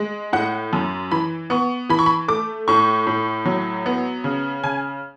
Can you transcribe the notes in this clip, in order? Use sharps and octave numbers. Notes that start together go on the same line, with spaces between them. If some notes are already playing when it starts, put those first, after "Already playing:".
Already playing: G#3
A2 F#5
F#2
E3 B5
B3 C#6
E3 B5
C#6
B5
A3 D6
A2 C#6
A2
F#3
B3
C#3
C#3 G#5